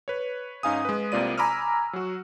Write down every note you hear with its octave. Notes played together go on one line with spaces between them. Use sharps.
B4 C#5
G#2 C#4 D#4 F5 G#5 D#6
G#3 B4
C2 C3 A#3 F4 D5 D#7
G#5 A#5 B5 D6 E6 F6
F#3 F#4